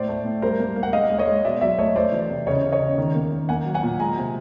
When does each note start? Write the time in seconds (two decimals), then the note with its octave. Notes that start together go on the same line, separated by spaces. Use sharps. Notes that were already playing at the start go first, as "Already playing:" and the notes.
Already playing: A2 C5 D5
0.09 A3
0.25 A2
0.42 G3 A#4 C5
0.59 A#3
0.76 A#3
0.83 F#5
0.93 G#3 D#5 F5
1.10 G#3
1.19 C#5 D#5
1.27 G#3
1.44 B2 D5 E5
1.61 F#3 D5 E5
1.78 A3 C#5 D#5
1.96 A3 C5 D5
2.12 E3
2.30 C3
2.47 C#3 C#5 D#5
2.63 C#3
2.72 C#5 D#5
2.80 C#3
2.98 D#3
3.15 A#3
3.32 D#3
3.49 A#3 F#5 G#5
3.66 F#3
3.74 F#5 G#5
3.83 A#2
4.00 G#3 G#5 A#5
4.17 C3